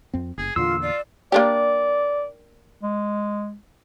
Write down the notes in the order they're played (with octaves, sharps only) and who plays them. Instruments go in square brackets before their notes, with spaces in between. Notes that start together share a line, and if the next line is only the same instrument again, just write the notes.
[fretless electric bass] F2 C4
[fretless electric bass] F#1 [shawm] G#4
[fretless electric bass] E2 A#2 D3 [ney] F4 [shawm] C6 [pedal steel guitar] E6
[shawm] F4 [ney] D5
[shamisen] A#3 D4 G4 [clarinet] D5
[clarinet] G#3